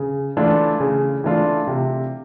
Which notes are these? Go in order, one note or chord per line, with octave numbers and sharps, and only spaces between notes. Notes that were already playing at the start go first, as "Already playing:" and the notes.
Already playing: C#3
E3 A3 D4 F4
C#3
E3 A3 D4 F4
C3